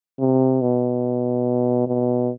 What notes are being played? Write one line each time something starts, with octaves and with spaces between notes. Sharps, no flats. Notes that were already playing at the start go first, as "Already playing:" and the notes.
C3
B2
B2